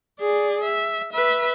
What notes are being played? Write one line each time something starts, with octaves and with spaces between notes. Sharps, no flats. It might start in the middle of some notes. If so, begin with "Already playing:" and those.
G#4 D5
E5
B4 E5